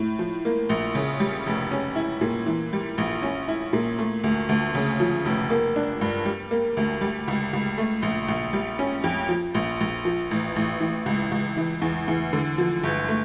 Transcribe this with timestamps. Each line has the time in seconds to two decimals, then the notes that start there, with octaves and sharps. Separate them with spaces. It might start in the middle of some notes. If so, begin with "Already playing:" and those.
Already playing: A2
0.19 F3
0.45 A#3
0.69 A#1
0.95 C#3
1.20 G3
1.46 F1
1.71 C#4
1.96 E4
2.21 A#2
2.46 E3
2.73 G3
2.98 A#1
3.22 C#4
3.48 E4
3.73 A#2
3.99 A3
4.24 D2
4.49 D2
4.75 C#3
5.00 F3
5.25 F1
5.50 A#3
5.76 D4
6.01 G2
6.25 G3
6.51 A#3
6.77 D2
7.01 G3
7.28 C#2
7.53 C#2
7.78 A3
8.02 A#1
8.28 A#1
8.53 G3
8.79 C#4
9.04 F2
9.29 F3
9.54 A#1
9.80 A#1
10.05 F3
10.31 A1
10.56 A1
10.81 E3
11.06 C#2
11.32 C#2
11.57 E3
11.82 E2
12.08 E2
12.33 D3
12.58 F3
12.83 G1
13.08 A3